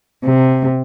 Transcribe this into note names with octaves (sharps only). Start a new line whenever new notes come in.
C3